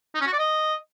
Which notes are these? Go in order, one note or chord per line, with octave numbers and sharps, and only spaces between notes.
D#4
C#4
F#4
D5
D#5